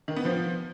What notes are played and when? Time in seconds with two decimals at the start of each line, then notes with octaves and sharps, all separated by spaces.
0.08 D#3
0.16 B3
0.25 F3